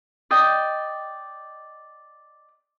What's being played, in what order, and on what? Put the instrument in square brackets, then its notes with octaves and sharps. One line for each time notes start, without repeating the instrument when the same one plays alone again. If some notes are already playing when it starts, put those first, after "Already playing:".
[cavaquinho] D5 D#5 G5